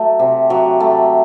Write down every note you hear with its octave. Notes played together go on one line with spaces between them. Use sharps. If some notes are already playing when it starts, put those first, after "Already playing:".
Already playing: F#3 A3
C3
F#3
A3